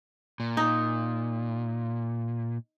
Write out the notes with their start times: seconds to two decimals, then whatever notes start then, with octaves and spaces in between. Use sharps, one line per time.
0.40 A#2
0.57 D#4